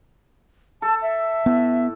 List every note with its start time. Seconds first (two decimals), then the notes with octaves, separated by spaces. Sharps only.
0.82 A4 A5
1.02 E5
1.46 A2 B3